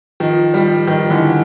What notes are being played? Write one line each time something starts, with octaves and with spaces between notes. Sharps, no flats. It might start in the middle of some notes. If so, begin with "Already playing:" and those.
D#3 F3
F3 G3
D#3 F3
D3 E3